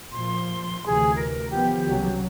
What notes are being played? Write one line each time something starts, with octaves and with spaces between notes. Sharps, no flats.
A#2 F3 C6
D2 C3 E3 G#4
A#4
D#3 F3 B3 G4
C2 C#3 F#3